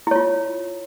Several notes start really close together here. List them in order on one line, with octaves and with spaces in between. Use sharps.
E4 C#5 F4